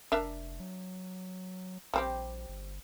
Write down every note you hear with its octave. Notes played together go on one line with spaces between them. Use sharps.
F1 D4 A#4 E5
F#3
A#1 G3 C4 G4
G1